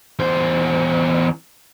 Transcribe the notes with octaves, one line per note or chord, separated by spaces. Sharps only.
E2 C5